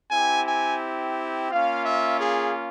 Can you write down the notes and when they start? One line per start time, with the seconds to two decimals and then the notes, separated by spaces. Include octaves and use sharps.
0.11 C4 E4 G4 G#5
0.46 G#5
1.50 A#3 C#4 F4 F5
1.85 E5
2.20 G#4